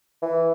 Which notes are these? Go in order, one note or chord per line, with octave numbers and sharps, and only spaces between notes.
E3